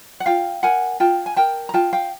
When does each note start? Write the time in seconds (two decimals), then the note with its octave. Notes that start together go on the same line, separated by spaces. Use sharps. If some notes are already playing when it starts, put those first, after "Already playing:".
0.20 F#5
0.26 F4 F5 G5
0.63 A#4 F#5 G#5
1.00 F4 G5 A5
1.26 G#5
1.36 A#4 G5 A5
1.69 A#5
1.74 F4 G5 A5
1.93 F5 G5